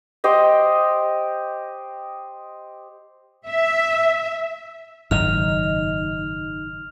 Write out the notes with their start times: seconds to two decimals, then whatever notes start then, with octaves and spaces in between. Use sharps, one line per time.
0.24 G4 C5 D#5
3.46 E5
5.11 F#1 G#2 D#3 D#4 F6 F7